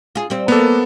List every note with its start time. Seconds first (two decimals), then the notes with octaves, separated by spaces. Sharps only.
0.15 F4 G#4
0.30 G3 C4
0.48 A#3 B3 A4